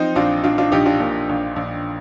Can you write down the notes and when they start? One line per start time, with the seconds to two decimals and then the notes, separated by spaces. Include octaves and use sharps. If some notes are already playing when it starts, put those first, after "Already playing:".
Already playing: F3 C4 D#4
0.16 A#1 D4 F4
0.44 A#1 D4 F4
0.58 D4 F4
0.72 A#1 D#4 G4
0.86 D4 F4
1.00 A#2
1.29 A#1
1.56 A#1